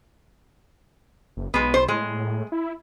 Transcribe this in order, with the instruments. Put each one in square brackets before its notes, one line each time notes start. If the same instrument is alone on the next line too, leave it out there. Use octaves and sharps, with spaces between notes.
[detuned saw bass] F#1
[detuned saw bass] B1 [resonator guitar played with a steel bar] G#3 B3
[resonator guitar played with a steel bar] C5
[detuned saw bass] A2 [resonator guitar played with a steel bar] G#3
[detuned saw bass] E4